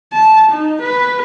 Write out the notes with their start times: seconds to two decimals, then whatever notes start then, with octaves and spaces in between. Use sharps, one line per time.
0.13 A5
0.51 D#4
0.82 B4